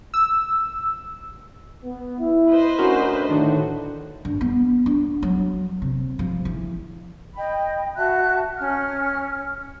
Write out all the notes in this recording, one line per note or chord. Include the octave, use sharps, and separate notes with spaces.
E6
B3
E4
B4 C5 D#5
D3 A3 C#4 D4 F#4 A#4
A2 D3 D#3 D4 F#4
G2
B3
D4
F#3
C3
F3
E3
D#5 G5 B5
F#4 E5 A5 F#6
C#4 F6